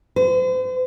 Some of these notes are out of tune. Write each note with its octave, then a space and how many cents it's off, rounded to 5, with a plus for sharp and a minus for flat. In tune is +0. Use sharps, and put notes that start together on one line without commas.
C5 -40